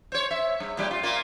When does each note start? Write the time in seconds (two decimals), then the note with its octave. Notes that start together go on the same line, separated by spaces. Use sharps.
0.12 C5 C#5
0.31 E5
0.60 G2
0.77 A#2 G3 G4
0.91 F4
1.03 A#2 A#3 F4